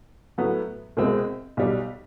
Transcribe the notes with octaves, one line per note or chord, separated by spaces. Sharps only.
A2 F#3 B3
C2 B2 G#3 C4
B1 B2 G3